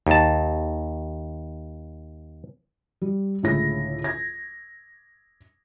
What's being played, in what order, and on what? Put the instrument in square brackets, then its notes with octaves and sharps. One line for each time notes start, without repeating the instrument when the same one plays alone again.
[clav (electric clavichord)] D#2 A5
[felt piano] G3
C#2 A2 D3 E4 G#4 A#6
G#6 A#6